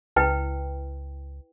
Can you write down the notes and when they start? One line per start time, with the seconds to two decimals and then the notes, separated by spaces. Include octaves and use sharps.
0.16 C#2 E4 B4 G5